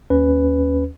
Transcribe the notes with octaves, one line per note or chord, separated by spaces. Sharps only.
D#2 C#4 B4